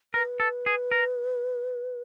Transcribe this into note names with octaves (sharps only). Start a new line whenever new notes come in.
A#4 B4
A4
G#4
A#4